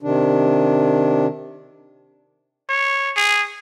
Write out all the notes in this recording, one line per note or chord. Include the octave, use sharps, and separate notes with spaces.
C3 D#3 D4
C#5
G#4